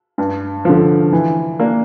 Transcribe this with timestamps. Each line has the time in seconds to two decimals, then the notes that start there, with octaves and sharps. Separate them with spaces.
0.18 G2
0.65 D3 F3
1.13 E3
1.60 A#3 D4